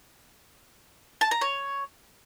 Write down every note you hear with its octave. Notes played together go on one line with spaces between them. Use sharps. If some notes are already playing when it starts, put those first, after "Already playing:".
A5
A#5
C#5